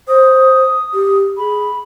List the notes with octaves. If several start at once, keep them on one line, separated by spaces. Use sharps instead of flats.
C5 D#6
G4
G#4 B5